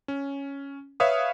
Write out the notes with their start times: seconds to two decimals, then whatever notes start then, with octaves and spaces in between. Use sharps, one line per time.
0.08 C#4
1.00 B4 C#5 E5 F5 D#6